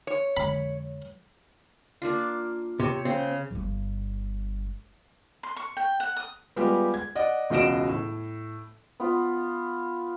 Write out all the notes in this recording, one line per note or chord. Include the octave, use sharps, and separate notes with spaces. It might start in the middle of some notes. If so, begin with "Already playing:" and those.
C#5
F2 D3 G#3 B5
A#3 D4 F4
C3 C#5
C#3 C4
G1 G2
C6
C#6
G5
F#5
D#6
G3 G#3 B3 F4 G4
G#6
D5 D#5 F#5
E1 C#2 F#4 D#5 D7 E7
A2
B3 F4 B5